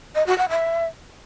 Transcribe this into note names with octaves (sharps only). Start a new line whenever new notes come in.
D#5
F#4
F#5
E5